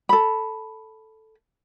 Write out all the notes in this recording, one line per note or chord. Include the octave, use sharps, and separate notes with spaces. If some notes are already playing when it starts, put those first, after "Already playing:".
A4 B5